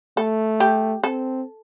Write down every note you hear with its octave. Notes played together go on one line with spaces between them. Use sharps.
A3 A4
G4
C4 A4